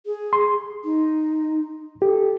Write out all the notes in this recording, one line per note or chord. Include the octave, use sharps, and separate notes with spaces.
G#4
C6
D#4
G4 A4